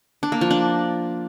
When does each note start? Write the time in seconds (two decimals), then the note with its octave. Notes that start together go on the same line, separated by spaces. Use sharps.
0.23 D4
0.32 A#3
0.41 F3
0.51 D4